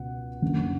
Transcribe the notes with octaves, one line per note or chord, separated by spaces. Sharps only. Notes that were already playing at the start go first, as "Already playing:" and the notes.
Already playing: C#2 B2 F#5
F#1 F#2 D3